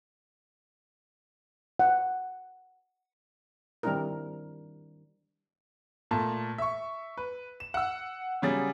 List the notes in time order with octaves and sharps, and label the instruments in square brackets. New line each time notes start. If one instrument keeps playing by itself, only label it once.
[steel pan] F#5
D#3 G3 C4 D4 E4 A#4
[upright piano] A#2 A3 A5
E5 C#6
B4
E7
F#5 E6
C#3 F#3 G3 G#4 A6